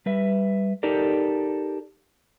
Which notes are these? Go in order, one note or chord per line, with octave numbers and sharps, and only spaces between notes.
G3 B4 E5
D#4 G4 A4 A#4 D5